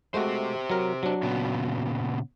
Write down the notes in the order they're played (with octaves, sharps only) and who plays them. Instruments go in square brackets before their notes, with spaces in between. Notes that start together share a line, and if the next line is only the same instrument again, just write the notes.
[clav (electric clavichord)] G#3 A3 F#4 [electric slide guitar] G4 C5
[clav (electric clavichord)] F#3 A#4
F#3 D4
[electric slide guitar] A#2 C#3 B3